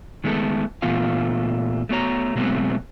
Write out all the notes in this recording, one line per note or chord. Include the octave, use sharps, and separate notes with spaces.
D#3 G#3 A3 B3 A4
A#2 E3 A3 B3 F4 F5
A3 B3 F#4 C#5 A#5
B2 F#3 G#3 A3 B3 C4